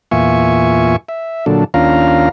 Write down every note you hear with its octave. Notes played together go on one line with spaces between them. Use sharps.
E2 A#2 F4 E5 G#5 C#6
E5
A#2 D3 F#3 D4 A4
D#2 C#4 D4 F4 F5 A#5